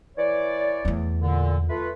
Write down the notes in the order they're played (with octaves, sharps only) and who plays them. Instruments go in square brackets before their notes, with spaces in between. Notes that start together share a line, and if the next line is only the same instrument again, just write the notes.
[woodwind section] E3 C#5 D5
[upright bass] E2 A3
[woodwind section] A#2 D3
A3 F4 B4